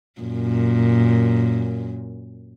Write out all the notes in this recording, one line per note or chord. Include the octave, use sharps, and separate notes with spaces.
F#2 A#2